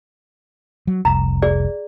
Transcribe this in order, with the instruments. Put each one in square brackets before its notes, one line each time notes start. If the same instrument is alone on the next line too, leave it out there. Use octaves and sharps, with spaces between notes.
[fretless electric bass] F#3
[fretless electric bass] F1 C2 [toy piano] A#5
[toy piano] G#4 D5